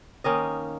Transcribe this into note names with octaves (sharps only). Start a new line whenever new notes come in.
D#3 A#3 C#4 D#5